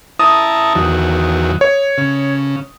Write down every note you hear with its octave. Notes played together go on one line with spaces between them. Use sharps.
E4 A5 A#5 D#6
E2 D#3 F#3
C#5
C#3